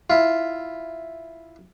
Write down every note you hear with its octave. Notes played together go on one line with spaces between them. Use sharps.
E4 F4